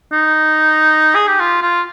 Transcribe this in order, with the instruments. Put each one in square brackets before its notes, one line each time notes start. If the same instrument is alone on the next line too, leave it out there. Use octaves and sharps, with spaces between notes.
[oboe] D#4
G#4
G4
F4
F4